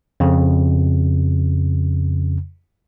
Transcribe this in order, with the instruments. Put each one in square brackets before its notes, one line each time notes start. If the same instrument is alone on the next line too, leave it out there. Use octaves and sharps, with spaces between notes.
[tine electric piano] F2 C#3